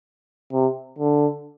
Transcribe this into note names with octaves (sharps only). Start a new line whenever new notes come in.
C3
D3